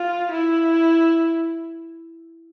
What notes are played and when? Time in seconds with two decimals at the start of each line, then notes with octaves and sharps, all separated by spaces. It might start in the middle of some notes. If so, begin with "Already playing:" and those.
Already playing: F4
0.32 E4